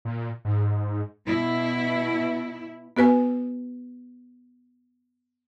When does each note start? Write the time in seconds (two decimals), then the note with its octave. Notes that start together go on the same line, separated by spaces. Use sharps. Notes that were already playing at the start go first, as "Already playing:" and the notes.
0.05 A#2
0.45 G#2
1.26 B2 E4
2.97 B3 F#4 B4 G#5